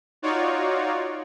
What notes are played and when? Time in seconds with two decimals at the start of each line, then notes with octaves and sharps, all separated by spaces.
0.22 D#4 F4 F#4 C#5 D5